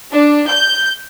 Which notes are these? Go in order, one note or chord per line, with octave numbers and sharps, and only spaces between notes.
D4
G6